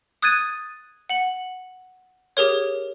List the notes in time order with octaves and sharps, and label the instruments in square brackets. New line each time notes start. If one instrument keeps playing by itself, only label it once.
[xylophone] D#6 F#6 G#6 A6 D#7
F#5 F#7
G4 G#4 A#4 C#5